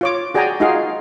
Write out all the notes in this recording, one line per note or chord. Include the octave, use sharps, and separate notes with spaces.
F4 C#5 D6
F#4 G#4 D5 G5 G#5 A#5
D#4 F4 F#4 G#4 F5